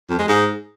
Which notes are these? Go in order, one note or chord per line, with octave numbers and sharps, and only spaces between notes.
F2
G#3
G#2